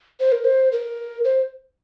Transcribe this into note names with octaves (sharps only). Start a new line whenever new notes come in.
C5
A#4
C5
A#4
C5